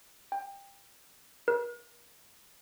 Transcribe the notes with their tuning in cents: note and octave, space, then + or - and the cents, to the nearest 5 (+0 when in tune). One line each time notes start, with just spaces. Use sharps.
G5 +20
A#4 +45